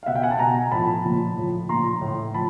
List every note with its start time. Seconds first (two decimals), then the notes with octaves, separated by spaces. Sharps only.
0.03 F5
0.06 B2 E5 F#5
0.15 F5 G5
0.23 F#5 G#5
0.31 G5 A5
0.39 B2 G#5 A#5
0.71 A2 F3 A5 B5
1.04 A#2 F3
1.37 A2 F3
1.69 A#2 F3 A#5 C6
2.01 A2 E3
2.34 F3 A5 B5